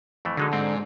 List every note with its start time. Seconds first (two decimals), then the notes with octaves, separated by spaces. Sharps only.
0.25 F2 E3 A3
0.37 D3 F#3 G#3 D#4
0.53 G#2 C4